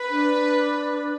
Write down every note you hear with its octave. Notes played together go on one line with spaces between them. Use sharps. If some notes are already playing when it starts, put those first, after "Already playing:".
Already playing: B4
D4